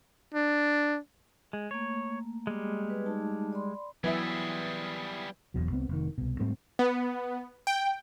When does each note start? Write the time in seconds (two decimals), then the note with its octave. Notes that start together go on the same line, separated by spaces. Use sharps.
0.34 D4
1.53 G#3
1.71 A3 A#3 C#5
2.47 G3 G#3
2.90 B3 B4
3.06 A3 D#4 A5
3.53 D5 B5 C6
4.04 E3 F#3 G3 B3 E4 G#4 E5
5.54 E1 E2 B2 F#3
5.71 C2 B3 C4
5.89 F1 D#3
6.18 C2 B2
6.40 G#2 G3 A3 C4
6.79 B3
7.67 G5